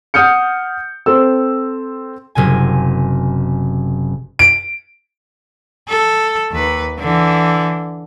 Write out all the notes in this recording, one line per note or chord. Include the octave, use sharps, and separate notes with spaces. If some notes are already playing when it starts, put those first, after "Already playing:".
F#5 D#6 F6 G6 C#7
C4 A4 E6
F#1 C3 G#5
D7
A4
D#2 B4
D3 E3